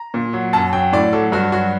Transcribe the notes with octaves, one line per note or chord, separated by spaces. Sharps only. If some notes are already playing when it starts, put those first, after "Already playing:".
Already playing: A#5
A#2
F#3
F#2 A5
F#3 G5
A2 D5
F#3 A4
G2 F#4
F#3 F#4